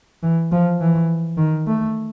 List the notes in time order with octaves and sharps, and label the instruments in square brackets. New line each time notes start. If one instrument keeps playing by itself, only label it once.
[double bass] E3
F3
E3
D#3
A3